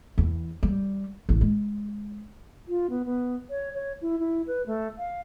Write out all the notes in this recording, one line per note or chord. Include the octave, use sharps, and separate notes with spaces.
E2
G3
A1
G#3
F4
B3
B3
C#5
C#5
E4
E4
B4
A3
F5